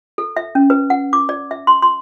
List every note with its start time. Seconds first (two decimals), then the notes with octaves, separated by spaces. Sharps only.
0.18 A4
0.37 E5
0.55 C#4
0.70 B4
0.90 F#5
1.13 D6
1.29 D5
1.51 E5
1.67 C6
1.82 C6